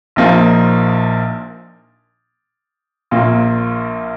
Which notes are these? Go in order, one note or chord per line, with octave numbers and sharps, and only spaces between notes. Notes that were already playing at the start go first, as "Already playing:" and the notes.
A#1 A#2 F3 A#3 D#4
A#1 A#2 A#3 F4